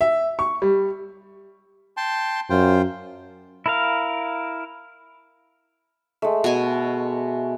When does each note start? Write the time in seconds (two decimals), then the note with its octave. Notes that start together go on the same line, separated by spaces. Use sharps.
0.01 E5
0.39 C#6
0.62 G3
1.97 G5 A5 C6
2.50 F#2 F4 C5 G5
3.66 E4 A#4 F5
6.22 G#3 A3
6.44 B2 G#5